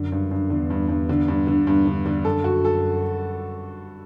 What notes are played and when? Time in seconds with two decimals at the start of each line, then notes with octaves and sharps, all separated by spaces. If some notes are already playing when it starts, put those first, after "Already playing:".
Already playing: F#2 D3
0.12 G2
0.31 G2
0.50 E2 D3
0.70 G2
0.89 G2
1.09 D3
1.28 G2
1.47 D3
1.67 E2 G2
1.86 D3
2.06 D3
2.25 F#2 A4
2.44 F#4
2.65 A4